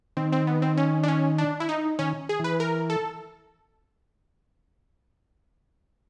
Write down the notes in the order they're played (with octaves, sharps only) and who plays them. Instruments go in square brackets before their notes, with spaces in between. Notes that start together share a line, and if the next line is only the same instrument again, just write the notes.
[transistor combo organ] D#3 [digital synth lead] C4
[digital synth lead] C4
B3
C4
C#4
D4
C#4
D4
E4
D#4
[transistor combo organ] D#3 [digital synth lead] C#4
[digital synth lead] G#4
[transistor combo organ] E3 [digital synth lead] B4
[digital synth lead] A#4
A4